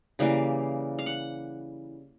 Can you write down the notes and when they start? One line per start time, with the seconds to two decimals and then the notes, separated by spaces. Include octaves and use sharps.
0.19 C#3 E3 G3 A#3 F5
0.99 F5
1.06 F#5